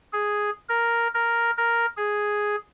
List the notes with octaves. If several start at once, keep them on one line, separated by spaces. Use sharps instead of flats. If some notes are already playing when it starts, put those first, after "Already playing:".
G#4
A#4
A#4
A#4
G#4